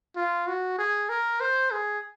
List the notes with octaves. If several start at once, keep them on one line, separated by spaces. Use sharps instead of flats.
F4
F#4
G#4
A#4
C5
G#4